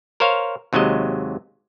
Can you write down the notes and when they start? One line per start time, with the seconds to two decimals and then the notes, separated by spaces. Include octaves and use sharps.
0.20 A#4 C5 C#5 F5
0.73 D#2 C3 F#3 G#3 D#5